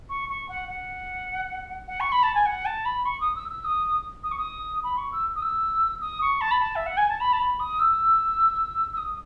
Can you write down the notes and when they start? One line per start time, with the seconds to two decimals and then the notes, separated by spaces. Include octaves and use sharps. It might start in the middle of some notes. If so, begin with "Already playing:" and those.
0.09 C#6
0.29 C#6
0.49 F#5
0.69 F#5
1.88 F#5
2.00 C#6
2.12 B5
2.23 A5
2.35 G#5
2.46 F#5
2.65 A5
2.85 B5
3.05 C#6
3.20 D#6
3.35 E6
3.50 E6
3.64 D#6
4.23 D#6
4.31 C#6
4.38 D#6
4.83 B5
4.98 C#6
5.12 E6
5.36 D#6
5.42 E6
6.01 D#6
6.21 C#6
6.41 A5
6.51 B5
6.60 A5
6.76 E5
6.86 F#5
6.97 G#5
7.09 A5
7.20 B5
7.33 A5
7.40 B5
7.60 D#6
7.79 E6
8.93 E6
8.97 D#6